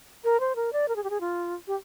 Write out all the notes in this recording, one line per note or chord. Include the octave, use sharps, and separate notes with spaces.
A#4
C5
A#4
D5
A#4
G#4
G4
G#4
F4
G4